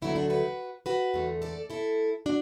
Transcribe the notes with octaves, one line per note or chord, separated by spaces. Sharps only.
D2 D3 F#3 A3 B3 E4
D4 F#4
F#4 B4
F#4 B4
E2 D3 A3
A4 D5
E4 A4
D4 F#4